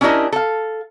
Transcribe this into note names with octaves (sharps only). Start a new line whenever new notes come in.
C#4 D4 E4 G4 A#4 D#5
A4 F5